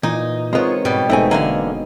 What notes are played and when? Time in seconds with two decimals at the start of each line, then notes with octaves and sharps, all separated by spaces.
0.03 A#2 E3 D#4
0.53 G#3 B3 C4 F4 A#4 C#5
0.85 G#2 B2 G3
1.10 E1 G#3 A3 B3 C4 D#4 G#5
1.31 E1 D3 E3 A#3 G#5